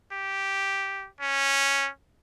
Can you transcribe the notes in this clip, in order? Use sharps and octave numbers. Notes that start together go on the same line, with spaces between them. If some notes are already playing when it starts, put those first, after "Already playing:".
G4
C#4